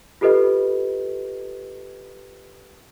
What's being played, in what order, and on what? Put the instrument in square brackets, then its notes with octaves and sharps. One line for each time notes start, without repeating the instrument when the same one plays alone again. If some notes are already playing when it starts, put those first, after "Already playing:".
[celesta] F4 G4 A4 B4 D#5